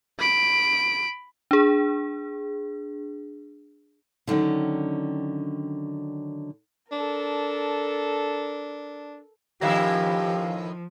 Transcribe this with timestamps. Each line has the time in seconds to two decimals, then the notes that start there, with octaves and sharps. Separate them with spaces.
0.19 B5 D7
1.51 D4 G#4
4.27 D3 D#3 F#3 C#4
6.92 D4 A4 A#4
9.61 A2 D#3 F3 C#4 E4 G4 F5 A#6